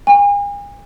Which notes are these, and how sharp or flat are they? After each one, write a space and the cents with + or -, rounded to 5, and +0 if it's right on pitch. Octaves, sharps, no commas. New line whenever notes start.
G#5 -40